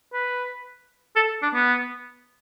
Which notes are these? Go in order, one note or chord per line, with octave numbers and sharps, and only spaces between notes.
B4
A4
D4
B3